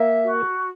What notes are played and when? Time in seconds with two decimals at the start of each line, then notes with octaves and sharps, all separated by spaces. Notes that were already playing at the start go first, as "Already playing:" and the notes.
Already playing: A#3 E5
0.22 F#4